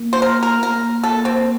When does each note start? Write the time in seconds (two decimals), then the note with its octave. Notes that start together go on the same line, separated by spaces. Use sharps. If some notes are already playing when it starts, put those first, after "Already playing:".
Already playing: A#3
0.13 C5
0.22 A#4
0.43 A#4
0.63 A#3 A#4
1.03 A4
1.25 C4